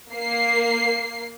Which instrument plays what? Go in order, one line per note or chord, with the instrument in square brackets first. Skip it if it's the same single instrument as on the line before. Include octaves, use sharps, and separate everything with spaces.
[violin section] A#3 C7